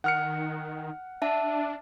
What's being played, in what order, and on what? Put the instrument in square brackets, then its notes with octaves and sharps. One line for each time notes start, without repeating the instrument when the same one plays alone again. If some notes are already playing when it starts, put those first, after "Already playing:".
[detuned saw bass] D#3 [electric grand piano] F#5 F6 C#7
[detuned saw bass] D4 [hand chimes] E5 A5